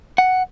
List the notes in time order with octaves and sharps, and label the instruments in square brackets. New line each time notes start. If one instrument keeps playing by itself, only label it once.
[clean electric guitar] F#5